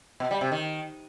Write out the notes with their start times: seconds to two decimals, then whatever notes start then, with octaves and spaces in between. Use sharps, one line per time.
0.20 B2
0.31 G3
0.41 C3
0.52 D#3